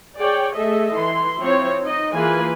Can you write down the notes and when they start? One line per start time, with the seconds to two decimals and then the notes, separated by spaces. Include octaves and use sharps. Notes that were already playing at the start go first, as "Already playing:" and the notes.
0.19 G#4 C#5 D5 G5
0.55 A3 G#4 A4 D#5 E5
0.95 E3 E4 C6
1.40 F3 C4 E4 C#5
1.80 D#4 D#5
2.14 E3 A#3 F4 G#4 B4 G#5